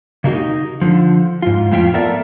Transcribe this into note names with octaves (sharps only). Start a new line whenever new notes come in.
C#3 A#3 D#4 E4 F#4 G4
D#4
D3 F3
G#2 F4
F2 A2 F3 F4 E5 G5
B3 A4 A#4 D5 E5